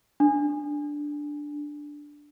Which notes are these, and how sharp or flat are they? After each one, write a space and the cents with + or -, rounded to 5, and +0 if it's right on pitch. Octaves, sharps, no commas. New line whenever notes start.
D4 +0